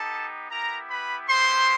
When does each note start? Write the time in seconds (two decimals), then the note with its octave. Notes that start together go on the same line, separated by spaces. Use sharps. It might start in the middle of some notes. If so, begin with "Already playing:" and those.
Already playing: B3 D#4 G4 A4 A5
0.51 B3 E4 G4 A#4 A#5
0.90 B4 B5
1.28 G#3 B3 E4 G4 C5 C6